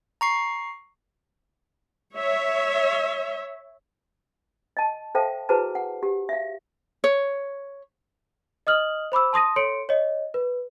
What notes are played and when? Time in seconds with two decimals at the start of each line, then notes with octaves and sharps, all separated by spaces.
0.21 A#5 C#6 C7
2.14 C#5 E5
4.77 D#5 A5
5.15 A4 C5 E5 F5 G5 A5
5.49 E4 F#4 G#4 B4 C5 A5
5.75 F#5
6.03 G4
6.29 E5 F5
7.04 C#5
8.67 D#5 D#6 F6 F#7
9.12 C5 B5 D6 E6
9.33 A5 C6 D#6 A#6 D#7
9.56 A4 C#5 C6 C#7 D7
9.89 C#5 D#5
10.34 B4